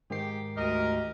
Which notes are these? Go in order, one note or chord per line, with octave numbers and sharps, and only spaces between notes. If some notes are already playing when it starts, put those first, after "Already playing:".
G#2 D#3 G4 C7
D2 G4 A#4 D#5